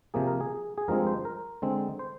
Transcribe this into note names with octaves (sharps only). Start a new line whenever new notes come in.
C3 F3 A#3 G#4
A#4
G#4
G#4
G2 F3 G#3 C4 A#4
C5
A#4
D3 G#3 C4
C5